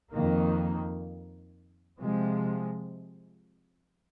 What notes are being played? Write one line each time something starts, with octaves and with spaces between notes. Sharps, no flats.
F2 D#3 A#3
C3 F3 G#3